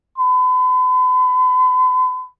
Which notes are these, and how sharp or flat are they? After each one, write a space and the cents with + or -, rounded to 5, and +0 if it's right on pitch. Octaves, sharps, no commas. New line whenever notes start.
B5 +40